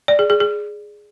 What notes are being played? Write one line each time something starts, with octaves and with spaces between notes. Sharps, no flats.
D5
G#4
G#4
G#4